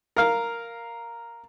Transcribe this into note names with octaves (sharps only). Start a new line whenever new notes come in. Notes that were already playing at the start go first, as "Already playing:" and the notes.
A#4 F5